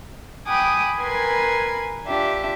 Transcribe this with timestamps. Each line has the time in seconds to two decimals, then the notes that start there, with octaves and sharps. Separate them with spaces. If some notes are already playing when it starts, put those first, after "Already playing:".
0.48 G5 G#5 B5 D6 D#6 F#6
1.00 A#4 B4 G#5 C6 G#6
2.06 D4 F4 G4 E5